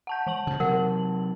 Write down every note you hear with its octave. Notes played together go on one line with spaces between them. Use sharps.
F#5 A5 G6
E3 A5 F#7
G2 C#3
C3 F#3 A#4 F#5
A#4